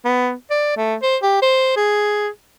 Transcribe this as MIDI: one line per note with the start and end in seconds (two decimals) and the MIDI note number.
0.05 0.33 59
0.50 0.77 74
0.77 0.95 57
1.03 1.17 72
1.22 1.39 67
1.42 1.74 72
1.76 2.29 68